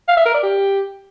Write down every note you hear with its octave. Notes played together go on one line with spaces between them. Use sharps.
F5
E5
A#4
D5
G4